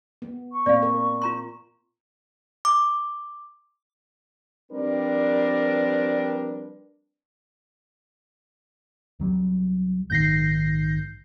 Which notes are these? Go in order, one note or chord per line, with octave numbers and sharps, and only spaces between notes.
B3
C#6
A#2 C4 D5 F5
A#4
F4 A#5 C6
D6
F3 G3 C4 D4 A#4 B4
C2 F#3 G3
A#1 G#2 D#3 G6 A#6 C7